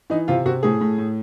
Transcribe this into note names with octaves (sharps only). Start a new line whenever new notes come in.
E3 D#4
C3 F4
C3 F#4
A2 G#4
A2
A2